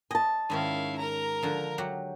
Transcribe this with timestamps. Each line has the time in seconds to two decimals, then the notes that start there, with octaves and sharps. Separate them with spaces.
0.11 D#5 G#5 A5
0.50 G#2 D#3 C#4 E4 F5
0.98 A#4 A#5
1.43 D3 F3
1.78 F#3 G4 F#5